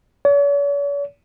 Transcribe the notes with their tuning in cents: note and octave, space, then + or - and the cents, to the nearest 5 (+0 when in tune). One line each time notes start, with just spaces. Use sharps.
C#5 +45